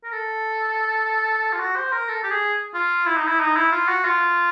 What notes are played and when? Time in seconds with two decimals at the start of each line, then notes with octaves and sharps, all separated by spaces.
0.04 A#4
0.12 A4
1.53 F4
1.59 F#4
1.76 C5
1.92 A#4
2.09 A4
2.24 G4
2.30 G#4
2.74 F4
3.06 E4
3.17 D#4
3.27 E4
3.40 D#4
3.56 E4
3.72 F4
3.88 F#4
4.05 F4